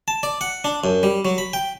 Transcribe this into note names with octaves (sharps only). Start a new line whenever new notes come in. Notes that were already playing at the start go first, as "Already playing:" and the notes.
A5
D5
F#5
D4
F#2
G3
F#3
B5
G5